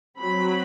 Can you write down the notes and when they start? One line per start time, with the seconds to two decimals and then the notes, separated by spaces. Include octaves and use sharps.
0.19 F#3 C4 B5